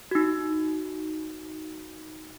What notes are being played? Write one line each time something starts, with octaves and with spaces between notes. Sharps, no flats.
D#4 F#4